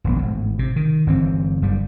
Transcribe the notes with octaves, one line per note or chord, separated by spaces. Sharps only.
D#1 A#1 B3
G#1 A2
C3
D#3
G1 E3 C4
F#1 G3